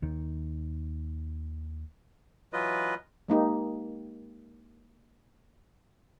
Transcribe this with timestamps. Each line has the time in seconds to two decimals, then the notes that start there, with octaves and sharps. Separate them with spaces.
0.02 D#2 D#3
2.53 E3 F#3 F4 B4 D#5
3.29 G#3 A#3 D#4 G4